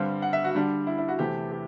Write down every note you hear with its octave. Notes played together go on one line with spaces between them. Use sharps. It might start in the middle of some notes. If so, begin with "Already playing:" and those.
Already playing: G2 D3 G3 C4
F#5
E5
F#4
D3 G3 D4
E4
E4
F#4
E2 C3 E3 A3 G4
G4